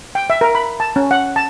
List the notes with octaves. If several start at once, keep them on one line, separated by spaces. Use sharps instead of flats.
G5
E5
A#4
B5
A5
C#4
F#5
A5